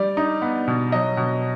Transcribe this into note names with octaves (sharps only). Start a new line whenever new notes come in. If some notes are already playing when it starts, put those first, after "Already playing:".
Already playing: G3 D5
D#4
B3
B2
F#3 D#5
B2